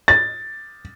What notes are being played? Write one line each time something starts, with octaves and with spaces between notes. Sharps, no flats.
A6